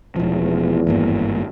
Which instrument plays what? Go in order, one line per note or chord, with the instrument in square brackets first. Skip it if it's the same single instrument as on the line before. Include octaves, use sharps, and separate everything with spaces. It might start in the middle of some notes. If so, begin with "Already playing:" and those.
[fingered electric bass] E1 F3 [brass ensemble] E2
[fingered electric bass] G#1 G2 A#3